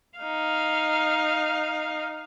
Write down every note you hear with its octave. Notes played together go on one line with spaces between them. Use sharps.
D#4 F5